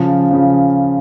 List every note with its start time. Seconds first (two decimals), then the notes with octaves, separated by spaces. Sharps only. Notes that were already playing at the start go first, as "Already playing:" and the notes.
Already playing: C#3 F3 A5
0.31 C#3 F3